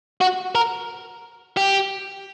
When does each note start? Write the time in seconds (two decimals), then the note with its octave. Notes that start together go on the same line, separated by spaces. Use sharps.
0.21 F#4
0.55 A#4
1.57 G4